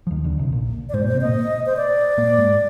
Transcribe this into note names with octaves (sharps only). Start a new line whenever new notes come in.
F3
D#2 D#3
D2 D3
C2 C3
A#1 A#2
D5
G#2 G#3 C5
A#2 A#3 C5
C3 C4
A#2 A#3 D#5
C5
D5
A#2 A#3
G#2 G#3